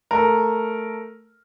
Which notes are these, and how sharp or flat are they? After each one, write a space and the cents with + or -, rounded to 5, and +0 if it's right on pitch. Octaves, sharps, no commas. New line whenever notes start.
A3 +0 A#4 +0